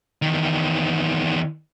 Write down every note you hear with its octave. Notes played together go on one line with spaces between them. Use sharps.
E2 D#3